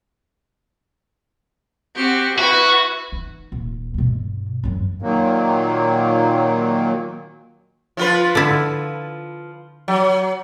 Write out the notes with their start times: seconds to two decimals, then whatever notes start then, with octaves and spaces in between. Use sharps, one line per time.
1.96 C4 F#4 G4
2.38 E4 F#4 B4 E5
3.12 D#4
3.52 D#1
3.94 G2 B2
4.64 F#2 F#3
5.02 A#2 D#3 F#3 A#3
7.97 F3 F4 B4
8.35 D3 E4
9.88 F#3